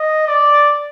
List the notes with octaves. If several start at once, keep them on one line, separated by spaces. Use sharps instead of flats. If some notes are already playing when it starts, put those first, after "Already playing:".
Already playing: D#5
D5